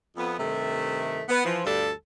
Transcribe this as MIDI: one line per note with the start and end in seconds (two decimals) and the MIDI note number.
0.17 0.39 41
0.17 0.39 59
0.39 1.22 43
0.39 1.22 48
0.39 1.22 51
0.39 1.22 57
1.29 1.44 59
1.45 1.61 52
1.45 1.61 53
1.65 1.90 38
1.65 1.90 43
1.65 1.90 55
1.65 1.90 62
1.65 1.90 69